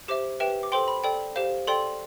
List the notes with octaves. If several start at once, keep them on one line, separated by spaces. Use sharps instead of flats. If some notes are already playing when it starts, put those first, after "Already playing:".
G4 C5 E5 D6
G4 B4 E5 G5
D6
A4 C5 G5 C6
B5
A4 D5 G5
G4 C5 F5
A4 D5 G5 C6